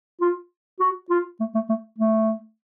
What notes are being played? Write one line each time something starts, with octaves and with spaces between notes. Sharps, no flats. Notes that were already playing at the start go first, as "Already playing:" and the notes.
F4
F#4
F4
A3
A3
A3
A3